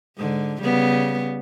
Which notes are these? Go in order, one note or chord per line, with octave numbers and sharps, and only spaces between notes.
G#2 D3
C#3 G3 B3